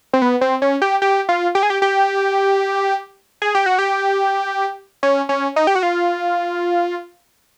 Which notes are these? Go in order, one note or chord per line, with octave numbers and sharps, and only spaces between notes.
C4
B3
C4
C#4
G4
G4
F4
G4
G#4
G4
G4
G#4
G4
F#4
G4
C#4
C#4
D#4
G4
F#4
F4